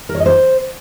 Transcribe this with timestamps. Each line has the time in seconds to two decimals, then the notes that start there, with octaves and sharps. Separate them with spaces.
0.09 A#4
0.15 C#5
0.20 D#5
0.26 C5